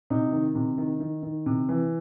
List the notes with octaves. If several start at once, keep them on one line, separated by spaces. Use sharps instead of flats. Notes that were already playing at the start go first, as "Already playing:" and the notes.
C3 D#4
D#3
C3
D#3
D#3
D#3
C3
E3